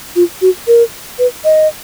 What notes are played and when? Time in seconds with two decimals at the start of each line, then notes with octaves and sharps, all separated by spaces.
0.16 F4
0.42 F#4
0.67 A#4
1.19 B4
1.44 D#5